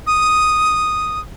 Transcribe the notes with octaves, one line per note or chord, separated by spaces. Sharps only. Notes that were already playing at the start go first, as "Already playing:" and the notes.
D#6